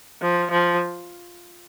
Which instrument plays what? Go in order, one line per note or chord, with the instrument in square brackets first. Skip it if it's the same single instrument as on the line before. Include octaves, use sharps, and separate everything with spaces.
[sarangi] F3
F3